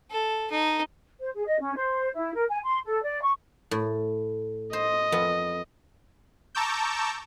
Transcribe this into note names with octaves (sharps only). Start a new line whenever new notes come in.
A4
D#4
C5
G#4
D#5
C#4
C5
E4
A#4
G#5
C6
A4
D5
C#6
A2
C5 D#5
F2 B3
A5 A#5 C#6 D6 E6 G6